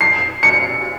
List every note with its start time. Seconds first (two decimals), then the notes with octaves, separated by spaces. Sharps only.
0.01 C7
0.43 C#7